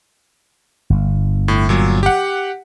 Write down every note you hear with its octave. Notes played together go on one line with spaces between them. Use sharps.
G1
A2
A#2 F#3
G4 F#5